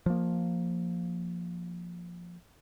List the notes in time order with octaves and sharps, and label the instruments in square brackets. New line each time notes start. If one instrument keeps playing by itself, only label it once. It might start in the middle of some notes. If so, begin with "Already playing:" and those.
[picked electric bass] F3 A#3